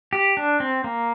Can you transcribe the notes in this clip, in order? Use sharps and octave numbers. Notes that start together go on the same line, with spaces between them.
G4
D4
C4
A#3